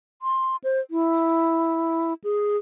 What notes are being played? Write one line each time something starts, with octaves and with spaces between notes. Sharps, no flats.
C6
C5
E4
G#4